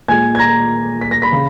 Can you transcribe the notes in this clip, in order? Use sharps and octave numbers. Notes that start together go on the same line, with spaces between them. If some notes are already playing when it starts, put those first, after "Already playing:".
A#2 G#3 G#5 G#6
G#6
A#5 A#6
B6
A#6
B5 B6
C#3